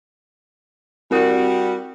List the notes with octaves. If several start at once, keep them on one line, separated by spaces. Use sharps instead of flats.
G3 C4 F#4 A#4 D#6